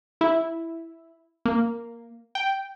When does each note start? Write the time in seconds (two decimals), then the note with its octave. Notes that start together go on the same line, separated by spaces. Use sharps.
0.21 E4
1.45 A#3
2.35 G5